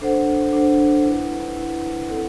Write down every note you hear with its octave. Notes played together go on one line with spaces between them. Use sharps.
D4 A4 C5 F#5
D4 A4 C5 F#5
E4 B4 F#5
E4 B4 F#5
C4 E4 A4 D5 F#5